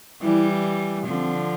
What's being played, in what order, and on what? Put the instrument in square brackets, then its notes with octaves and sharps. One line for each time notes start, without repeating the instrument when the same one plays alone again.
[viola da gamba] E3 G3 [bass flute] E4
[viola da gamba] D3 F3 [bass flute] C4